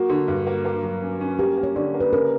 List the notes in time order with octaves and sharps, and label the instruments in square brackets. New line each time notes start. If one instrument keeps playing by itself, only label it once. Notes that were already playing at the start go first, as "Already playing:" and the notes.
Already playing: [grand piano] A#3 [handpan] F#4
[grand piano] D3
G2
A#3
A#3
F#3
C#4
C#4
[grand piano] A#3 [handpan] G4
[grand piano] A#3
[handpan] C#5
[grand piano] D3 [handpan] D5
[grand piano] A#3
[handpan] B4
[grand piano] C#3 [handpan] A#4